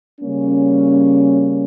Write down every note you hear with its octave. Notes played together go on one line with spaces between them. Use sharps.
C#3 G3 A#3 C#4